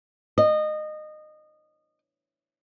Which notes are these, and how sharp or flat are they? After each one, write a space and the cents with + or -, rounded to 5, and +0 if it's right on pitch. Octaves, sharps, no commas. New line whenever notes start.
D#5 -25